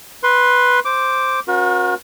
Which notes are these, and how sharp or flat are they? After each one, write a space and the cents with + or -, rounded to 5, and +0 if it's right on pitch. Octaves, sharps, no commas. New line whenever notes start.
B4 +0 C6 +10
C5 +0 D6 +0
C#4 -35 F#4 -35 A#4 +35